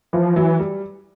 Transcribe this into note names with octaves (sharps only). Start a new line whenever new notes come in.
E3 F3
E3 F#3
G3